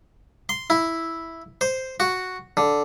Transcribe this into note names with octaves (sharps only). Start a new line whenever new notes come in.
C6
E4
C5
F#4
D3